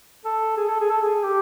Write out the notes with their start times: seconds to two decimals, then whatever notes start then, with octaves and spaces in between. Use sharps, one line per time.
0.25 A4
0.57 G#4
0.69 A4
0.81 G#4
0.91 A4
1.02 G#4
1.23 G4